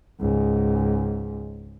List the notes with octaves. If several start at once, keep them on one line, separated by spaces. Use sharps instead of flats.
C#2 G#2